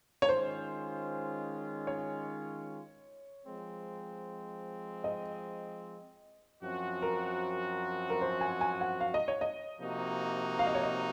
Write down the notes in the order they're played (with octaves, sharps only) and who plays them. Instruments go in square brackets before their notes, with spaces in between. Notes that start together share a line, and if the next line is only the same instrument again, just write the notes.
[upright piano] C#5
[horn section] D#3 G#3 C#4 F4 [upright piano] C5
[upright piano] C#5
[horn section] F3 G#3 C4
[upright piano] D#5
[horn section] F#2 F3 C4 F#4
[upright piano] A#4
A#4
C5
G#5
G#5
F#5
F5
D#5
C#5
D#5
[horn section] C3 F3 A#3 D#4 F#4
[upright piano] F5
D#5
C#5
D#5